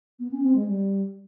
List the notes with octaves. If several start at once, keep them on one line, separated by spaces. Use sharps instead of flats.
B3
C#4
C4
G#3
G3